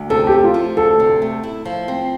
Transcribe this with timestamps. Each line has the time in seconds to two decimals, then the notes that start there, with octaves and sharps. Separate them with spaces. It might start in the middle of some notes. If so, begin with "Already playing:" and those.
Already playing: D2
0.10 C3 A4
0.27 G4
0.32 A3
0.44 F4
0.54 F3
0.77 D2 A4
1.00 C3
1.22 A3
1.43 E4
1.65 F3
1.88 C4